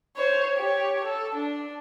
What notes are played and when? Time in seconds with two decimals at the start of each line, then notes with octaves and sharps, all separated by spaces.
0.16 C5 C#5
0.57 G4 C#5
1.05 A4
1.35 D4